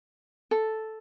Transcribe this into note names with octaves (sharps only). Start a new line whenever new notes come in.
A4